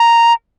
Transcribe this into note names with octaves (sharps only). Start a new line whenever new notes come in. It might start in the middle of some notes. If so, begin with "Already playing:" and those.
Already playing: A#5